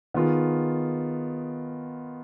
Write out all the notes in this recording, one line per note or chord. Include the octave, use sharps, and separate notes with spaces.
D#3 B3 F4 G#4